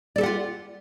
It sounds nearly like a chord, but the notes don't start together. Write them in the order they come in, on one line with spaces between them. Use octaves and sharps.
D5 A4 G4 F#5 F4